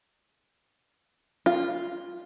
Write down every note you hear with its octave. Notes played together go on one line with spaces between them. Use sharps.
F4